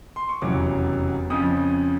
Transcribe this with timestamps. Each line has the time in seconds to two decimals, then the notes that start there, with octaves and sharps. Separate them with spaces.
0.16 C6
0.29 C#6
0.42 F1 E2 C#3 F#3 D6
1.30 F2 C#3 F3 D#6